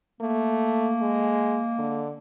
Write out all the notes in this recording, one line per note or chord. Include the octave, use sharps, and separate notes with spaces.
A3 A#3
G#3
D3